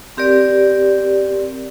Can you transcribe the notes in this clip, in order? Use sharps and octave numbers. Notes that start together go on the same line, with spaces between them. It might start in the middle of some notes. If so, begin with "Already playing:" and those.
C4 G4 A#4 D5